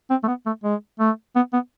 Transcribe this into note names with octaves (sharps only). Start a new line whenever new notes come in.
C4
A3
B3
A3
G#3
A3
B3
B3